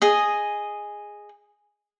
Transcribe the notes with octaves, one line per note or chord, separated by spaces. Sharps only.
G#4 D#5